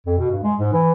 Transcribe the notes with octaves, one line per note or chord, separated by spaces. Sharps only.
F2
B2
G2
G#3
G#2
E3